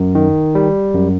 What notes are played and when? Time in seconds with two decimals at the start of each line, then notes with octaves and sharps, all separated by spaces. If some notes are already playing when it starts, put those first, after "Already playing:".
Already playing: F#2
0.15 D#3
0.55 G3
0.94 F#2